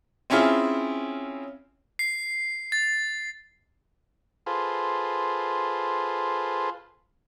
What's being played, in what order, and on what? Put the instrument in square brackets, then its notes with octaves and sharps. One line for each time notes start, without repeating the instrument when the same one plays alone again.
[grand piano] C4 C#4 E4 F4 G#4
[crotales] C7
A6
[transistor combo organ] F4 G#4 A4 B4 C5